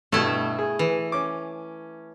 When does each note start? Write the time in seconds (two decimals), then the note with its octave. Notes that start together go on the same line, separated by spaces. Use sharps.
0.12 G2 B2 A3 E4
0.59 G#4
0.79 E3
1.12 C#4 D6